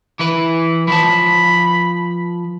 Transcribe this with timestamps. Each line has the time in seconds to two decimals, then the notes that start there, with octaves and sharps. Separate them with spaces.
0.19 E3 E4 B4
0.88 F3 B4 A5 B5